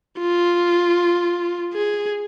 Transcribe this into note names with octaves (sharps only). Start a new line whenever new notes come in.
F4
G#4